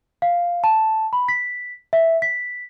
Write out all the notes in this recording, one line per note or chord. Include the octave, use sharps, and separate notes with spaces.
F5
A5
B5
B6
E5
B6